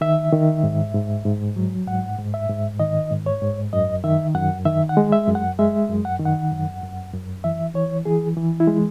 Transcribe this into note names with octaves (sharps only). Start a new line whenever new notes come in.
D#3 E5
D#3
G#2
G#2
G#2
F#3
G#2 F#5
G#2
E5
G#2
D#3 D#5
G#2
C#5
G#2
F#2 D#5
D#3 E5
F#2 F#5
D#3 E5
F#5
G#3
E5
F#2
F#5
G#3 E5
F#2
F#5
D#3
F#5
F#2
F#2
F#2
E3 E5
E3 C#5
E3 G#4
E3
E4
G#3